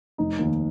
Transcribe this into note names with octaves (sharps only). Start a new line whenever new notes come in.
F1 D#4
D#2 D#3